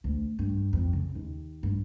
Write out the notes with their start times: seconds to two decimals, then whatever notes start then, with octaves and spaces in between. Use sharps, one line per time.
0.04 D2
0.39 G2
0.73 F2
0.93 C#3
1.15 D#2
1.63 G2